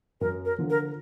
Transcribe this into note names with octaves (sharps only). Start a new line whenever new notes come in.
F#2 A#4
A#4
D3 F3
A#4